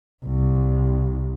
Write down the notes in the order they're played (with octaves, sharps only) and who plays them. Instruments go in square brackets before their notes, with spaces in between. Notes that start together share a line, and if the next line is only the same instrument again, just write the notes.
[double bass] C2